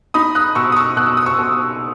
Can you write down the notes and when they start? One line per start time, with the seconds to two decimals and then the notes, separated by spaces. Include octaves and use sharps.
0.14 D#4 B5 D#6
0.35 D#6 F#6
0.55 B2 C#6 E6
0.72 D#6
0.76 C#6 E6
0.97 B2 F#6
1.06 E6
1.17 D#6
1.26 C#6 E6
1.38 B2